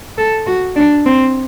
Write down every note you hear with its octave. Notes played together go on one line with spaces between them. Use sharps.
A4
F#4
D4
C4